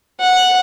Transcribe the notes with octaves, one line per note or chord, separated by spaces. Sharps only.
F#5